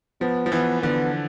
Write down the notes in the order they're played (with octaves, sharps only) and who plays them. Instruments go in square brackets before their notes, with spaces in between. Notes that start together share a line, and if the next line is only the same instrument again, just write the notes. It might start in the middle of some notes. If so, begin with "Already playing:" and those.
[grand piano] F3 [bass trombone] B3
[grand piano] F3
[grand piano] E3 [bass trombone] B3
[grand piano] D3 [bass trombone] B3